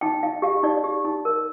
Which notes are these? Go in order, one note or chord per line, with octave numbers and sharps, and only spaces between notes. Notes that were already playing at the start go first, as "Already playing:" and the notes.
D#4 G5
D#4 F5
G4 F5
D#4 D5
G4
D#4
A#4